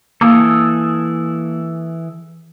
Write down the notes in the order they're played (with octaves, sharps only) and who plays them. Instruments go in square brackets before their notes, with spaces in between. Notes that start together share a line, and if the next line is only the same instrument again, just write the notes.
[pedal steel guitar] E3 G#4 A4 [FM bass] A#3